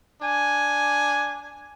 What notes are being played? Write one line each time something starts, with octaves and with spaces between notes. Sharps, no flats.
D4 G#5